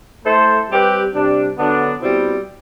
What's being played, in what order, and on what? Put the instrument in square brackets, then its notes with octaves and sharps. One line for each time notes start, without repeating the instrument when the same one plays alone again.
[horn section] A3 E4 A4 C5
G3 C4 G4 B4
C3 G3 D4
D3 F#3 B3 D4
B2 G3 C4 E4